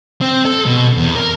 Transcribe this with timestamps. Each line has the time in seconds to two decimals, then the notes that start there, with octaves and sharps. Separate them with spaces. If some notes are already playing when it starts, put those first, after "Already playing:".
0.21 C4
0.45 A4
0.66 B2
0.97 E2
1.16 A#4